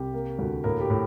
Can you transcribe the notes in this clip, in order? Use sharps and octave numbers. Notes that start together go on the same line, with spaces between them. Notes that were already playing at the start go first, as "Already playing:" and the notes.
Already playing: C2 G4
A#3
D2
A2 A#3 A#4
G4
A2